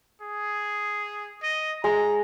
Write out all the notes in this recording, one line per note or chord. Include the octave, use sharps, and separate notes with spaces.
G#4
D#5
G#3 A#5